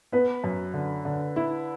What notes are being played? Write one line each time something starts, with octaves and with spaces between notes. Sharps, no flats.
B3 B4
F#2
D3
D3
E4